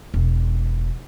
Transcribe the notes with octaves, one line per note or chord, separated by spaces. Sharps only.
E1